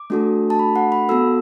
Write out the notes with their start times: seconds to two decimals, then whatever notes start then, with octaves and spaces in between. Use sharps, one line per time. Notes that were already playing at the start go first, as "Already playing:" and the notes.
Already playing: D6
0.10 A3 D4 F#4 A4
0.50 A5
0.59 B5
0.76 F#5
0.92 B5
1.09 B3 F#4 A4 E6